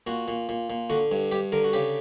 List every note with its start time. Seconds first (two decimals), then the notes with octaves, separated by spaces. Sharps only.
0.07 A#2 F#4
0.28 A#2
0.49 A#2
0.70 A#2
0.90 D3 F#4
1.12 G2
1.31 G2 G4
1.52 D3 A#4
1.64 F#4
1.73 C#3 G4